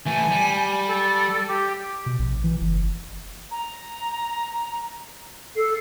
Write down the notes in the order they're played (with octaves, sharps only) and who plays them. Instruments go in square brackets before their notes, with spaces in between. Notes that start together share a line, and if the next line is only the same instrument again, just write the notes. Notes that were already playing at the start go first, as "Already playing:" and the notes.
[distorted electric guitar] E3 A3 [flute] G#5
[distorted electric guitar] G3
[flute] A4
G4
[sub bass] B2
A#1
E3
F#1
[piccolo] A#5
[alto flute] A4 [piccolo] C7